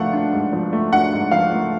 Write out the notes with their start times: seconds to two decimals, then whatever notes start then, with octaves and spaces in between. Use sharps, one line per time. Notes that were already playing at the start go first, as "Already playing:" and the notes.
Already playing: F3 A3 D4 F5 F#5
0.13 D4
0.32 G#2
0.53 F3
0.73 A3
0.92 D4 F#5
1.13 G#2
1.31 F3 F5
1.52 A3